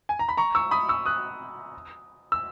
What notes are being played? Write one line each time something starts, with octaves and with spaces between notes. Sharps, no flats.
G#5
A#5
B5
A#5 C#6
C#6 E6
B5 D#6
C#6 E6
D#6 F#6
E6